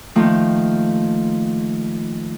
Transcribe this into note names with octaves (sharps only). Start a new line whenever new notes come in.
D#3 F3 A3 A#3